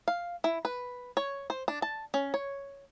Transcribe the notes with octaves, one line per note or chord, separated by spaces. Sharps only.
F5
E4
B4
C#5
C5
D4
A5
C#4
C#5